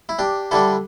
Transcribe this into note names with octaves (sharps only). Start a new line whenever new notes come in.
E4
D4 G4
D3 G3 D4 E4 A4